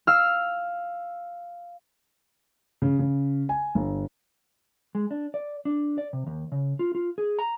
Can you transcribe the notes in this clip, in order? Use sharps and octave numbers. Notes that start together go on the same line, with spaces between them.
F5 E6 F6
C#3
C#3
G#5
G1
G#3
D4
D5
D4
D5
C3
D#2
C#3
F4
F4
G#4
A#5